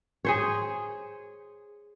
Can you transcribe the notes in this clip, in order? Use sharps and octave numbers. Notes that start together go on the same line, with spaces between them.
G#4 C5 C#5